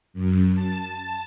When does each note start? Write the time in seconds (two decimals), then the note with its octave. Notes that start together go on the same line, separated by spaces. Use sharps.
0.13 F#2
0.54 A5
0.90 A5